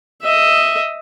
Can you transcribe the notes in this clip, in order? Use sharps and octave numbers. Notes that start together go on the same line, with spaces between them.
D#5 E5